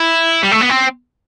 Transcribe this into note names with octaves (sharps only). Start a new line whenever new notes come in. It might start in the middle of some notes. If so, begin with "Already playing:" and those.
Already playing: E4
G3
A3
B3
C4